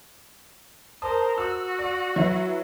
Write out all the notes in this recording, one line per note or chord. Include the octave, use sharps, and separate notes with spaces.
A#4 C5 A5 D#6
F#4 E6
D5
F#3 E4 B4